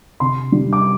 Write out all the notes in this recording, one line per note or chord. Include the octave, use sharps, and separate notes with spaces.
C3 C6
G3
D6